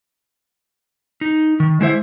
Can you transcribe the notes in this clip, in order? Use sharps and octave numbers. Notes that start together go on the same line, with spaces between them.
D#4
D#3
G#3 E4 C5 E5